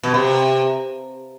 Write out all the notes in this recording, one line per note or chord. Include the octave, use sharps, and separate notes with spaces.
B2
C3